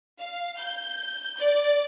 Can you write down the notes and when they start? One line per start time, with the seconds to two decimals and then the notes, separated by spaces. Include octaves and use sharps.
0.19 F5
0.59 G6
1.38 D5